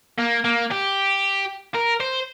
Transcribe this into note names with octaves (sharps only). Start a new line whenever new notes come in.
A#3
A#3
G4
A#4
C5